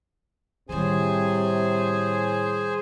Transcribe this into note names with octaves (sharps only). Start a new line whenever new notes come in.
A2 C3 D#3 G3 G#4 C5 G#5